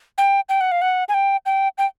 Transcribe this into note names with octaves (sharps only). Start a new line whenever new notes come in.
G5
G5
F#5
F5
F#5
G#5
G5
G5
G5